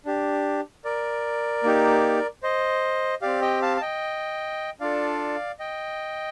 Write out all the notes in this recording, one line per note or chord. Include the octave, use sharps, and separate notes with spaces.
D4 G4
A#4 D5
A#3 D#4 G4
C5 D#5
C4 G4 D5 F5
D#5 G5
F5 A5
A5
D#5 G5
D4 F4 A4 D5 F5
D#5 G5